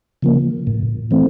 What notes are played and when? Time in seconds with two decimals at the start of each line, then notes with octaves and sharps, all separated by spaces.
0.22 C#3 F3 A#3
0.67 A2
1.11 E3 A3 C4